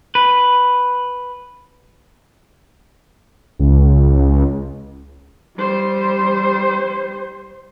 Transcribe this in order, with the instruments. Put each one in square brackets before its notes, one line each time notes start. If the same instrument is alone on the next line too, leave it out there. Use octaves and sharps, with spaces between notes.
[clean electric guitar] B4
[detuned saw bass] C#2
[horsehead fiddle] G3 C5